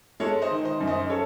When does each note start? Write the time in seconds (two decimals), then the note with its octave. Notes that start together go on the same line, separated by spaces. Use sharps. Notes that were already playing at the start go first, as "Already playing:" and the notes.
0.20 G#3 A4 C#5
0.42 C5 D#5
0.50 D#3
0.65 C5 D#5
0.80 F#2
0.87 C5 D#5
1.10 A4 C#5